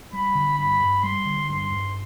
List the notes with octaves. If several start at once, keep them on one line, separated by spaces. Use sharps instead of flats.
G3 B5
D3
G2 B5
G2
G3 C6
D3
G2 C6
G2